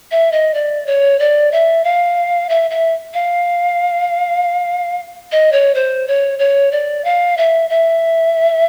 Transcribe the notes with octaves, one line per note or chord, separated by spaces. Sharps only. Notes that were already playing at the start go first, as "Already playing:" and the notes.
E5
D#5
D5
C#5
D5
E5
F5
E5
E5
F5
D#5
C#5
C5
C#5
C#5
D5
F5
E5
E5